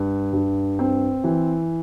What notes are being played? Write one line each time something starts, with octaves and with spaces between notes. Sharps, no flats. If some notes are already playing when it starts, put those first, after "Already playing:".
Already playing: G2
G2
C4
E3